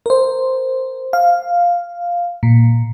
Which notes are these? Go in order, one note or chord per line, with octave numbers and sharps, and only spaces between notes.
A#4 C5
F5
A#2